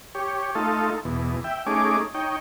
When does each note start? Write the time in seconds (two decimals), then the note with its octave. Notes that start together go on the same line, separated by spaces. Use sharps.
0.15 G4 C#5
0.55 A3 D#4 F4 A4
1.05 E2 B2
1.44 E5 G5
1.67 A3 C#4 D#4 G#4 D6
2.15 D#4 C#5 G5